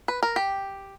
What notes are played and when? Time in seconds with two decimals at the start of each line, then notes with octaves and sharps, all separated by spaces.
0.08 B4
0.23 A#4
0.36 G4